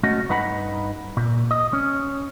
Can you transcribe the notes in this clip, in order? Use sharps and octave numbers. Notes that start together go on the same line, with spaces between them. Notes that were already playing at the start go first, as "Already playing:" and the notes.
C2 A3 C#4 F#4 D#5
G2 D#4 B4 F#5 A#5 B5
A#2
D#5
C#4